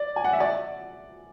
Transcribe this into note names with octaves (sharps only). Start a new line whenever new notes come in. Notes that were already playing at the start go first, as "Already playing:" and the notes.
Already playing: D5
G#5
F#5
E5
D5